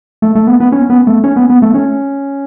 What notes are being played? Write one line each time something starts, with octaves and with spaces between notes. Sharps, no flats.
A3
A3
B3
B3
C#4
B3
A3
C#4
B3
B3
A3
C#4